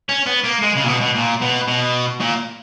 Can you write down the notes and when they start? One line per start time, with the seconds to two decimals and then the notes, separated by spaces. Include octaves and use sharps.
0.09 C#4
0.26 B3
0.44 A#3
0.62 G#3
0.75 C#3
0.84 A#2
0.88 B2
1.01 B2
1.15 A#2
1.42 B2
1.68 B2
2.20 A#2